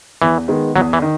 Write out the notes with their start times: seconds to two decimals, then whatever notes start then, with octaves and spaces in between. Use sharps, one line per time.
0.22 E2 E3
0.48 D#3 G#3 B3
0.76 E2 F#3
0.93 E3
1.02 D#3